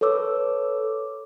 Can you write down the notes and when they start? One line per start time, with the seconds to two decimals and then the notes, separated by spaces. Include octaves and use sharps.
0.01 A4 B4 C#5 D6 E6